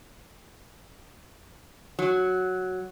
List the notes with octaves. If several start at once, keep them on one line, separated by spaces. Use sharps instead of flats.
F#3